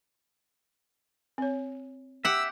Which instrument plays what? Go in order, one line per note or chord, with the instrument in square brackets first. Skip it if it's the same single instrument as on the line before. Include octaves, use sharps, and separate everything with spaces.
[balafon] C4 C#5
[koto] G4 F#5 [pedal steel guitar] E5 [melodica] E6